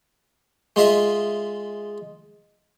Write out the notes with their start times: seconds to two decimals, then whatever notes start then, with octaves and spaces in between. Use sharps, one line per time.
0.76 G#3 F4 D#5 E5